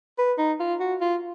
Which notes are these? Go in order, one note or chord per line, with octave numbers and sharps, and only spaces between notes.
B4
D#4
F4
F#4
F4